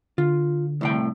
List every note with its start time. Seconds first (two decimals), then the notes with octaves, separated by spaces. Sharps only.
0.18 D3 F4
0.81 C2 A2 G5